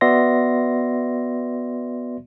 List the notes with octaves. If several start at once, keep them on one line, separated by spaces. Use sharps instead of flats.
B3 F#4 D5 E5 C6 A#6